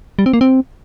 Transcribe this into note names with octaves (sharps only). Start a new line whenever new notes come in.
G3
C4
A#3
C4